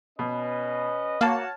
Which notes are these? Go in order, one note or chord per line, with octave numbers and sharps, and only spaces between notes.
B2 C#4 B4 D#5
A#3 F#4 C#5 A5 F6